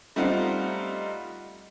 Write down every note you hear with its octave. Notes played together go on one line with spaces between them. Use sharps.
G3 A3 C4 D#4 F4 F#5